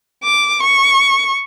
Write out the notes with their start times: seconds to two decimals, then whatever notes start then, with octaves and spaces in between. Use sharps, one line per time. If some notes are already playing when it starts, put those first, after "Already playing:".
0.24 D6
0.63 C#6